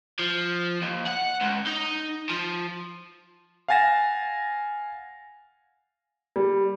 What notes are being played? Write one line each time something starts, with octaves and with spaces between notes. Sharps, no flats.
F3
D#2
F#5
C#2
D#4
F3
F5 F#5 G#5 A6 A#6 E7
G3